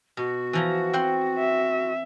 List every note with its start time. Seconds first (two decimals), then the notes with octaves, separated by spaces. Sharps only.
0.17 B2 F#4
0.53 E3 F3 A#5
0.93 C4 C5 F#5
1.39 E5